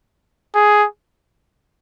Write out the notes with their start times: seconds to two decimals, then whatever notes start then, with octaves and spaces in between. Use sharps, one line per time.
0.54 G#4